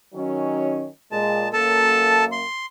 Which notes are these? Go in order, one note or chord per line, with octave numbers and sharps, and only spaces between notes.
D#3 F#3 C#4
A#2 G#3 A5
F#2 A#3 A4 A5
C6